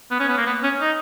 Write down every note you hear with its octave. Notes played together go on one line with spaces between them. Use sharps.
B3
C#4
B3
A#3
B3
C#4
D#4